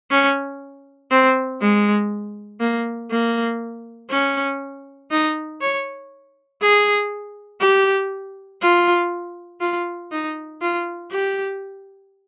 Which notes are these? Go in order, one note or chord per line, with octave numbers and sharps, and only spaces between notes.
C#4
C4
G#3
A#3
A#3
C#4
D#4
C#5
G#4
G4
F4
F4
D#4
F4
G4